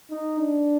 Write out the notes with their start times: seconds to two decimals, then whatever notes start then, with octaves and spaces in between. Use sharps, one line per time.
0.11 D#4
0.40 D4